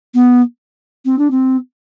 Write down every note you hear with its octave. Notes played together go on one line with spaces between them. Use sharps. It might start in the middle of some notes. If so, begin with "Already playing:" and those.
B3
C4
D4
C4